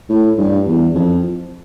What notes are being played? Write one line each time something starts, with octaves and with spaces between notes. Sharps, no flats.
A2
G2
E2
F2